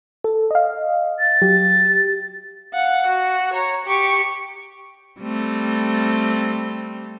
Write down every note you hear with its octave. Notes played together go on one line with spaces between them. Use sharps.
A4
D#5 F5
A6
F#3 G4
F5 F#5
F#4
C#5 A#5
G4 C#6
G3 A3 C4